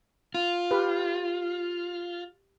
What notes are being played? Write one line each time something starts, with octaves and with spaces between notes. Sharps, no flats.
F4
G4 B4